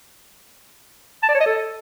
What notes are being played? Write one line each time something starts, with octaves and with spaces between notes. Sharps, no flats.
A5
D5
C#5
D#5
A4